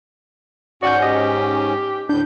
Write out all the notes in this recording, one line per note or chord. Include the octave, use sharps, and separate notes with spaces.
G#2 C#4 F#4 D5 F#5 G6
G4 D#5
D2 A2 D4 G6